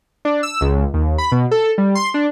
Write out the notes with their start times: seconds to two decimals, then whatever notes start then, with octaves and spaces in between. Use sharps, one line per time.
0.25 D4
0.43 E6
0.61 C#2
0.94 D#2
1.18 B5
1.32 B2
1.51 A4
1.78 G3
1.95 C6
2.14 D4